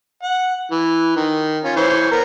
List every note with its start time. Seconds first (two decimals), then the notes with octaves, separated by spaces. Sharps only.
0.23 F#5
0.71 E3
1.17 D#3
1.64 C#4 F4
1.76 E3 C5 C#5
2.11 B3 A#4 A#5